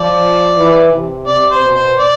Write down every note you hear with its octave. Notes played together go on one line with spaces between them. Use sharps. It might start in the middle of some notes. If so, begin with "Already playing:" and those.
Already playing: F3 D5
E3
C3
C3 D5
C5
B2
C5
D5